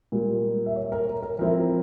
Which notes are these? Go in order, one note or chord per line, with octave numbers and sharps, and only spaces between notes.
A#2 G3 A#3
E5
C#5
A#4
A#4
A#4
F3 C4 E4 A#4